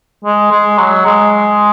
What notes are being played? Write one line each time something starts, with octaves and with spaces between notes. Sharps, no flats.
G#3
G#3
F#3
G#3